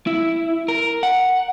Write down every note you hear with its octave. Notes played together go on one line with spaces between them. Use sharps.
E4
A#4
F#5